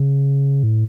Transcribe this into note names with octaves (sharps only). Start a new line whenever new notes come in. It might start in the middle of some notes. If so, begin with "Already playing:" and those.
Already playing: C#3
A2